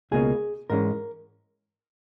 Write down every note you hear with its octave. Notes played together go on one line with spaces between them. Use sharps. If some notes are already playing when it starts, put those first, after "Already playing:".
C#2 B2 A#3 C#4 G#4
G#2 E3 G#3 C#4 A#4